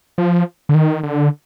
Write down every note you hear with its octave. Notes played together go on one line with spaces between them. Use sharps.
F3
D3
D#3
D3